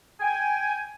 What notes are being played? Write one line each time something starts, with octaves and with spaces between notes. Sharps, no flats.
G5 G#5